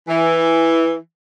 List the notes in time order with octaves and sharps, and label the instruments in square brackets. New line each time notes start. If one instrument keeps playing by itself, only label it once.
[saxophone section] E3